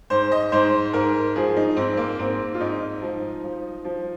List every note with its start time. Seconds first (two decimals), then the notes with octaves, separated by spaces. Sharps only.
0.10 G#2 C5
0.32 D#5
0.52 G#2 C5
0.93 G#2 A#4
1.36 F3 G#4
1.56 D#4
1.76 G#2 C4
1.97 A#3
2.18 G#2 C4
2.54 F4
2.60 G#2 D#4
3.02 F3
3.44 F3
3.84 F3